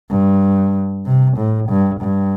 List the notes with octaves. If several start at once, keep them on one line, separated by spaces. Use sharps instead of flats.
G2
C3
A2
G2
G2